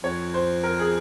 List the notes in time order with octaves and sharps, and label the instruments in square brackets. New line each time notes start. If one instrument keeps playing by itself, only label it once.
[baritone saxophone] F2 [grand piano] C#5
[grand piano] C5
A#4
G#4